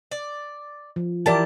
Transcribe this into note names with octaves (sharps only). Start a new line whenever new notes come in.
D5
F3
E3 E4 G4 A#4 D5 A5